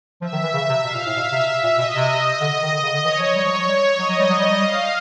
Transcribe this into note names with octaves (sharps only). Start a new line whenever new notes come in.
F3 E5
D#3
E3
C#3
C3
B2 F5
A#2
A2
B2 E5
C3
A#2
B2 D#5
C3
D3
D#3
D3
C#3
D3
E3 C#5
F3
G3 C#5
F3
F#3
G3
F#3 D#5
F#3
G3
F#3
G3
G3
F5